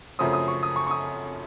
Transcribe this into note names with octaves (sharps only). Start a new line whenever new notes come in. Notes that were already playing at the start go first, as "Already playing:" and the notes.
F#2 C#3 F3 A3 C4 D#6
D#6
C#6
D#6
C#6
C#6
D#6